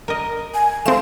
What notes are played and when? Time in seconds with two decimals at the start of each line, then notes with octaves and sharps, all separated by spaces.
0.08 A#4 D#5
0.54 G#5
0.86 A3 C4 F5 E7